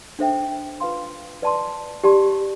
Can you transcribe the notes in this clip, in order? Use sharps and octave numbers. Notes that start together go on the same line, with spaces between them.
D4 A4 C5 E5 G5
F4 B4 F5 C6
B4 D5 A5 C6
G4 D5 A5 C6